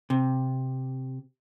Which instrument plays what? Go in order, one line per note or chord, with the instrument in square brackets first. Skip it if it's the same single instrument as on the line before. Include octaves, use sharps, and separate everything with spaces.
[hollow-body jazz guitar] C3